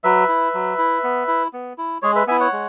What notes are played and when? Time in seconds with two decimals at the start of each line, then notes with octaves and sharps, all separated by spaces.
0.04 F#3 B4 E5
0.28 E4
0.54 F#3
0.78 E4
1.04 B3
1.28 E4
1.53 B3
1.78 E4
2.02 G#3 G#4 C#5
2.16 B4 E5
2.27 B3 E4 E5 G#5
2.40 C#5 F#5
2.53 G#3